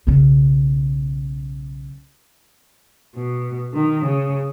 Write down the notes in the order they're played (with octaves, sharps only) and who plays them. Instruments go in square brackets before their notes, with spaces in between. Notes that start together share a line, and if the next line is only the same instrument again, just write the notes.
[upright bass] B1 C#3
[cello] B2
D#3
C#3